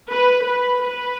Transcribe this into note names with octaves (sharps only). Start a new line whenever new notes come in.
B4
B4
B4